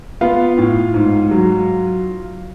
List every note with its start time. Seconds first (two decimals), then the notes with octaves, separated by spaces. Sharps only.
0.21 B3 F4 F5
0.58 A2
0.94 G#2
1.31 F#3